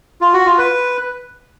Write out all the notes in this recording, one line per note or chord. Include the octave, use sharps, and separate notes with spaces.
F4
F#4
F4
B4